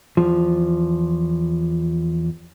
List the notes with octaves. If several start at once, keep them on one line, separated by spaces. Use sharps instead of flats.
E2 F3